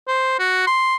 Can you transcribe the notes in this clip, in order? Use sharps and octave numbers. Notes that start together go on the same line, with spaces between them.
C5
F#4
C6